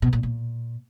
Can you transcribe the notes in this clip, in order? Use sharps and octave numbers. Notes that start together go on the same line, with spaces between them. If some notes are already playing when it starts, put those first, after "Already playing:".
B2
A#2
A#2